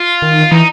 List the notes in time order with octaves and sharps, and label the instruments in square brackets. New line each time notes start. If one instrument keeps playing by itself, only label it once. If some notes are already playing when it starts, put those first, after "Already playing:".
Already playing: [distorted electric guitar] F4
[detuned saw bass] D#3
[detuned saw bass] E3 [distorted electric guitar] D#4